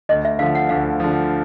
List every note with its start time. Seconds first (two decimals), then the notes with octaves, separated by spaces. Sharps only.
0.09 D2 D#5
0.25 E5
0.39 D3 F3 F5
0.55 F#5
0.69 D2 F5
1.00 D3 F3